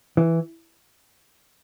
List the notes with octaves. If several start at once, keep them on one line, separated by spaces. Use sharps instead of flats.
E3